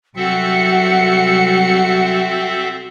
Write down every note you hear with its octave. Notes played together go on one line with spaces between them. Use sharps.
C2 F#3 C4 F#4 A4 E5 C#7